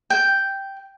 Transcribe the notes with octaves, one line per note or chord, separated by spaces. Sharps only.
G5